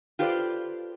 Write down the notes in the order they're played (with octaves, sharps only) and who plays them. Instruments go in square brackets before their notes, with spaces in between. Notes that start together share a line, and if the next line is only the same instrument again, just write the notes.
[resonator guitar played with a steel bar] F4 G4 A4 B4 C5 D5